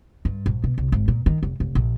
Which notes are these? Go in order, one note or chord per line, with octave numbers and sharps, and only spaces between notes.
G2
A#1
B2
C2
G#1
A#2
D#3
F1
F1
A#1